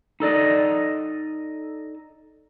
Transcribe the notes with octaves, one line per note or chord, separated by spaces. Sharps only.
D#4 A4 D5 D#5